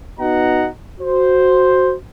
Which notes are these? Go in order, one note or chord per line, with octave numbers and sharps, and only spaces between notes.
B3 D#4 F#4 D#5 F#5 A#5
F#4 C5